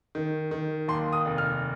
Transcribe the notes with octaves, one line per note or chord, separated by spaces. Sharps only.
D#3
D#3
D#2 C6
D#6
F1
F6